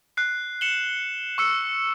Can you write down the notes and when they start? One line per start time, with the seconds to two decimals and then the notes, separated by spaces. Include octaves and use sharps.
0.17 F#6 C7
0.61 C#7 E7 F#7 G7
1.38 C#6 E6 C#7